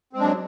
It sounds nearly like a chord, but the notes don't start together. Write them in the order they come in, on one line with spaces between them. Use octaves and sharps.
C4 G#3 D4 F#3